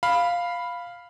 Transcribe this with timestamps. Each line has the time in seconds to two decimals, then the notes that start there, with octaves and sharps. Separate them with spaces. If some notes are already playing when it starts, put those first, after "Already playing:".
0.03 F5 B5